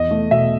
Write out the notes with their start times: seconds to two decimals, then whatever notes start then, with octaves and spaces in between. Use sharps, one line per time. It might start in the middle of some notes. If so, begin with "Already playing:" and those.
Already playing: E2 D#5
0.11 A3
0.31 B2 E5